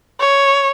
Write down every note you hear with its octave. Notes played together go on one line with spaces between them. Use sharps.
C#5